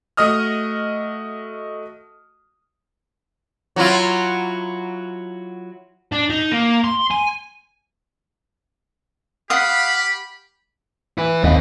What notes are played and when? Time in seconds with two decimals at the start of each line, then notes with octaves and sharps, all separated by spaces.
0.17 A3 F#4 D#5 D#6 F6
3.76 F#3 E4 F4
6.12 D4
6.30 D#4
6.52 A#3
6.84 C6
7.11 G#5
9.50 G4 F5 F#5 B5 D#6
11.18 E4 B4
11.44 D#2 C4 D#5